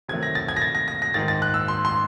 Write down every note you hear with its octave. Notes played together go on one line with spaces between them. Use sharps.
C3 D#3 F#3 A3 G#6
A#6
A6
G#6
A#6
A6
A#6
A#6
A#6
G#2 D#3 G#3 A6
A6
F#6
E6
C6
C6